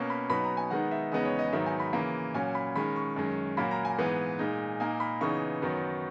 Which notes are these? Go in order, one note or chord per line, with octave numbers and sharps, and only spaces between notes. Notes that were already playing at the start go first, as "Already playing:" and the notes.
Already playing: B2 A#3 C#4 C#6
B5
B2 F#3 B3 D#4 B5
A#5
G#5
D#3 G#3 B3 D#4 F#5
E5
E2 C#3 G#3 B3 D#4 D#5
C#5
D#5
G#2 D#3 F#3 B3 D#4 E5
G#5
B5
C#3 E3 A#3
A#2 F#3 C#4 G#5
B5
D#3 G#3 C#4 B5
C#6
F#2 D#3 G#3 C#4
A#2 F#3 A#3 B5
A#5
G#5
G#2 E3 G#3 B3
A#2 G#3 D#4
A#2 A#3 D#4 G#5
B5
C#3 E3 B3 D#4 C#6
F#2 D#3 F#3 B3 D#4